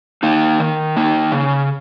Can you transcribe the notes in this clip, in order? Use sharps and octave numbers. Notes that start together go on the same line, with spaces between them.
A#3 D#4
D#3
A#3 D#4
C#3